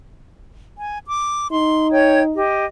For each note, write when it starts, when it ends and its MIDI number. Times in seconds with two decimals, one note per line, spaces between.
0.78 0.98 80
1.07 1.47 86
1.52 2.42 63
1.52 1.91 84
1.92 2.21 73
1.92 2.21 79
1.92 2.21 92
2.34 2.65 67
2.34 2.65 75